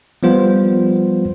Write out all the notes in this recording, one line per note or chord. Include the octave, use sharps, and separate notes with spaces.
F3 G3 B3 F4 C5